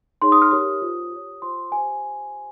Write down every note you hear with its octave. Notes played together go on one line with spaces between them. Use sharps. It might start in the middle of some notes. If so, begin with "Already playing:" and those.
D#4 G#4 C#5 C6
D#6
F6
G4 A#4 C#5 D#6
F4 C5
G4 C#5
F4 C5 C6
G4 G#5
C5